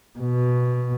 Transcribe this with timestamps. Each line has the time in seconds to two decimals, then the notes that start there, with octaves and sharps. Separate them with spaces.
0.19 B2